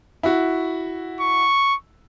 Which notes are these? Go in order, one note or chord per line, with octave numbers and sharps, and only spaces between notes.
E4 F#4
C#6